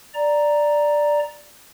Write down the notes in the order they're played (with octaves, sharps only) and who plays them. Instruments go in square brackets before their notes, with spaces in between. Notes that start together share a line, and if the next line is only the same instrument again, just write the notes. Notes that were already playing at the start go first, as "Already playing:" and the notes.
[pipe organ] D5 A#5